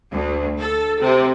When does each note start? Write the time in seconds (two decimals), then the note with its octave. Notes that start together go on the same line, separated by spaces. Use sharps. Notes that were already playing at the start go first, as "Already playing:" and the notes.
0.11 D2
0.59 A4
1.01 C3